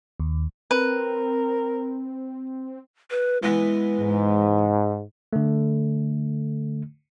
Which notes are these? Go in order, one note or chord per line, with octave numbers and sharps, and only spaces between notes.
D#2
C4 A#4 B4
B4
E3 G#3 B3
G#2
D3 A3